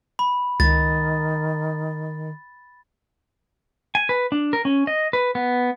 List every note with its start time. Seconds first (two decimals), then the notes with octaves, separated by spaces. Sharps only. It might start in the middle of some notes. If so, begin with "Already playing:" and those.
0.19 B5
0.60 C#2 D#3 A6
3.95 G#5
4.09 B4
4.32 D4
4.53 A#4
4.65 C#4
4.87 D#5
5.13 B4
5.35 B3